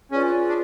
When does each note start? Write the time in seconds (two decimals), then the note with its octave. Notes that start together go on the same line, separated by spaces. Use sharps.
0.11 C#4 F4 G#4 B4 D5
0.49 D4